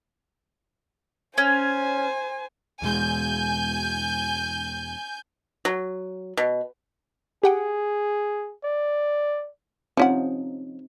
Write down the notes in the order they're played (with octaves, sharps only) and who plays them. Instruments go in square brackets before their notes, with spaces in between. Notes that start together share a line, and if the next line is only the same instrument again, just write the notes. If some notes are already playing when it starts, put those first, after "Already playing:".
[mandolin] C#4 [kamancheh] C5 G#5
[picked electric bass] E2 B2 G#3 [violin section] G#5 G6
[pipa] F#3
B2
[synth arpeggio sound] G4 F#5 G5 [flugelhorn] G#4
[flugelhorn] D5
[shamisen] F3 C#4 F#5 [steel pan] C4 D#4